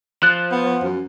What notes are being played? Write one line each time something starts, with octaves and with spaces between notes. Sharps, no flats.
F3 F#6 A6
B3
F#2